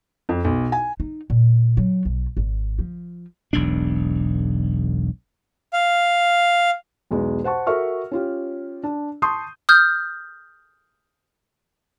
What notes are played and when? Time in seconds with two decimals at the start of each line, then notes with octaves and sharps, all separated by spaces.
0.29 F2
0.45 B1
0.72 G#5
1.00 D#4
1.30 A#2
1.77 F#3
2.05 B1
2.37 G#1
2.79 F3
3.53 E1 B1 E2 D4
5.73 F5
7.11 B1 E2 G#3
7.44 C5 F#5 A5 C#6
7.67 F#4 A4 A#4 E5 C#6 F6
8.11 C#4 F4 G4
8.83 D4
9.22 A5 C6 C#6 D#6 G6
9.69 D#6 F6 G6